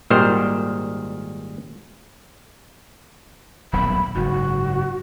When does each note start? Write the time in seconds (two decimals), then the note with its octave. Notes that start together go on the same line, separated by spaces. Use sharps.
0.10 G#1 A#2 D#3 G3 C5 A#5
3.73 D#1 B1 F#2 B5
4.15 F#1 G#2 F#4